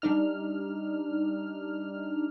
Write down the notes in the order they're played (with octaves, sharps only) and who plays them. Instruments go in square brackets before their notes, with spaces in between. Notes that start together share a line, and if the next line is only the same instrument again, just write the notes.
[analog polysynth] G3 D4 D#4 F6